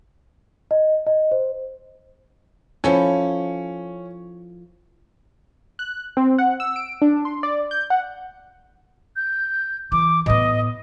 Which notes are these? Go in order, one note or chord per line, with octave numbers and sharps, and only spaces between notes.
D#5
D#5
C5
F3 C#4 E4 A4
F#6
C4
F#5
E6
D7
D4
C6
D5
G6
F#5
G6
E3 D6
A2 B3 D#5